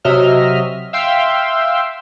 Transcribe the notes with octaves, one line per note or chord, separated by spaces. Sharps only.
C3 F#3 D#5 E5 F6
E5 F5 G5 C6 E6